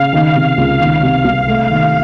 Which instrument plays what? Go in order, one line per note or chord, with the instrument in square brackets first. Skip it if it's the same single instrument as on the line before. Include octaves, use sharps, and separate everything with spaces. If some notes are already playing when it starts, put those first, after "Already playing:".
Already playing: [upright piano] C#3 [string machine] F5
[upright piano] D#3
C3
C#2
D#3
C3
C2
[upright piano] A3 [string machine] F5
[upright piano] D#3